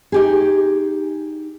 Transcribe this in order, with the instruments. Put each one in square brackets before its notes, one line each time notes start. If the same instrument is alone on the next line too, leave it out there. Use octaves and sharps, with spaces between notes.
[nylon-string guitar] D#4 G4 G#4